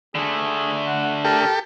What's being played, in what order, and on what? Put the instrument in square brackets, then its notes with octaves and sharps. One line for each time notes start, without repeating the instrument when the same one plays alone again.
[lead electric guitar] D3 A3 [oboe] G#4
[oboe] F#5
[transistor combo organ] G4 A4 [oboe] A#4